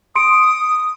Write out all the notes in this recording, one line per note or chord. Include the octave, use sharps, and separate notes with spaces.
C6 D#6 C#7 D7